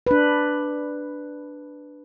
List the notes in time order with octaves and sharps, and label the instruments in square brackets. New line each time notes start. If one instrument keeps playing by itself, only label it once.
[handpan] D4 B4